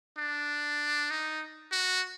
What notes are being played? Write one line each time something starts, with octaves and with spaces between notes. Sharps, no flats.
D4
D#4
F#4